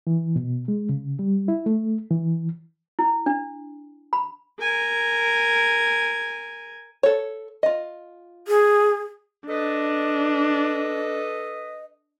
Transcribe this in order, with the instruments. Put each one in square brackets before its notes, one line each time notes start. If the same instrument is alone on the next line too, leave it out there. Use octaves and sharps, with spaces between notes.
[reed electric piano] E3
B2
G#3
C#3
G3
E4
A3
E3
[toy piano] E4
D4
B5
[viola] A#4 G#5
[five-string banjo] A4 C#5
F4 D#5
[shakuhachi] G#4
[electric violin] D4 [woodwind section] A4 B4 D#5